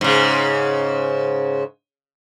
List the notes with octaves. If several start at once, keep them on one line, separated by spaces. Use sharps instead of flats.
G#2 C#3